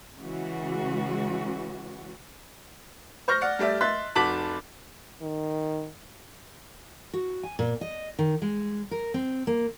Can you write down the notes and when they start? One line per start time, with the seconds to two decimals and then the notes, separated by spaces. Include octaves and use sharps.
0.17 C#3 E3 G#3 F#4
3.28 C5 C#6 F6 G6 A#6
3.41 D5 F#5 F6
3.59 G3 A3 D5 E5
3.81 D#5 E5 C6 F#6 A6 B6
4.15 F1 F#4 A5 D6 B6 F#7
5.22 D#3
7.13 F#4
7.43 G#5
7.59 A#2
7.81 D#5
8.19 D#3
8.42 G#3
8.91 A#4
9.14 C4
9.47 A#3